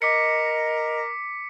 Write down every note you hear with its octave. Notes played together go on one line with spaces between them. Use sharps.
A#4 D#5 D6 B6 C#7